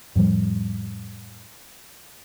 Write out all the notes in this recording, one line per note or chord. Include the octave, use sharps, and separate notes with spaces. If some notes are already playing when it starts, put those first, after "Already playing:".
F2 A2 F3 G3